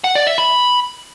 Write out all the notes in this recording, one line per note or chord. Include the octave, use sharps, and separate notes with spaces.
F#5
D5
E5
B5